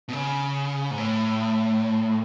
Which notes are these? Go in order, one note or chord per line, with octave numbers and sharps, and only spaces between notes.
B2
C#3
G#2
A2